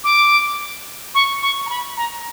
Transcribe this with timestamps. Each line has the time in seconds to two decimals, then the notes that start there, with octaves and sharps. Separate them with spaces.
0.04 D6
1.15 C#6
1.42 C#6
1.66 A#5
1.70 B5
1.97 A#5